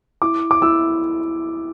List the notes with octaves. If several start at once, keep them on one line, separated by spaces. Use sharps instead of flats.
E4 D6
D6
E4 E6